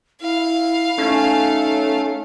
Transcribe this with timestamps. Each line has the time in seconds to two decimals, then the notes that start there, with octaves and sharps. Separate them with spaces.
0.22 E4 F5
0.98 A3 C#4 D#4